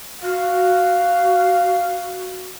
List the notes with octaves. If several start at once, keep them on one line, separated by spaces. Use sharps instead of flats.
F#4 F5